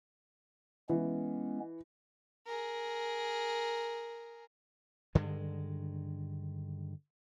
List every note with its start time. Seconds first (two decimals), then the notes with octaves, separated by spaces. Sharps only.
0.89 E3 G#3 B3 C#4
2.47 G#4 A#4
5.15 G2 D3 D#3 G#3